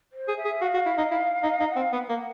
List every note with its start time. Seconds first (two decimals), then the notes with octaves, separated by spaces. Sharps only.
0.12 C5
0.28 G#4
0.37 E5
0.45 G#4
0.61 F#4 F5
0.74 F#4
0.86 E4
0.98 D#4
1.11 E4
1.43 D#4
1.60 D#4
1.71 F#5
1.76 C4
1.81 F5
1.92 B3 F#5
2.09 A#3